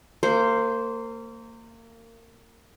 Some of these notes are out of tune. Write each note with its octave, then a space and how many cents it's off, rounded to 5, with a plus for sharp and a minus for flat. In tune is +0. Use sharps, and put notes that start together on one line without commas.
A#3 -30 C5 +0